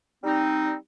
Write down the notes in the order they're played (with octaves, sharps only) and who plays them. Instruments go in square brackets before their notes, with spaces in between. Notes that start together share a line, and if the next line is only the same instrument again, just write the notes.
[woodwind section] G3 C4 D#4